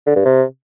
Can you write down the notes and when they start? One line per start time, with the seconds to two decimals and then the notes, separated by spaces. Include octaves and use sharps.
0.06 D3
0.16 G2
0.25 C3